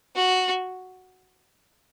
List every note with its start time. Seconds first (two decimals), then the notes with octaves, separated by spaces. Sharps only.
0.16 F#4